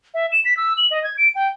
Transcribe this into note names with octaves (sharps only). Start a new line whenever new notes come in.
E5
E7
B6
E6
F#7
D#5
G#6
D7
G5